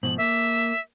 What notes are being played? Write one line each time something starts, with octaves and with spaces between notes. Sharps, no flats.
G#2 B2 F3 F#7
A#3 E5